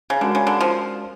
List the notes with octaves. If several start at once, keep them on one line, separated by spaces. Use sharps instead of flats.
C#3
D3 G#3 C#4 F#4 A#4 D5
C#3
D3
F3